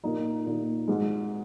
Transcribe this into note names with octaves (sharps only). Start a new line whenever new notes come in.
A#2 A#3 D#4
A#2 A#3 D#4
G#1 G#2 G#3